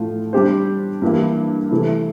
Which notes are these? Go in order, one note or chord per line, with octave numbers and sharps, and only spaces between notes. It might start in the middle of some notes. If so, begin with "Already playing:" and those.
Already playing: A2 F3 A3 F4
G3 D4 G4 C5
G2 E3 G3 A#3 E4
C3 E3 A3 E4